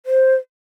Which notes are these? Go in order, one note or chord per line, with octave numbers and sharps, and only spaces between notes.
C5